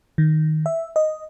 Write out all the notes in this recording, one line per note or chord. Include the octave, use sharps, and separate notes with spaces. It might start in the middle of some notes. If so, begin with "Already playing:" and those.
D#3
E5
D#5